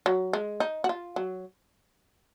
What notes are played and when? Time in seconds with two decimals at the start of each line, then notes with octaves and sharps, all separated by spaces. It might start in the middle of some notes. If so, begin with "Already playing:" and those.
0.06 F#3
0.33 G#3
0.60 D#4
0.84 F#4
0.89 F4
1.16 F#3